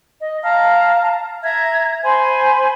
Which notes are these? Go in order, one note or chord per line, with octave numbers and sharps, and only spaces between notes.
D#5
F5 A5 A#5 F6
E5 A#5 G#6
C5 G#5 B5 C6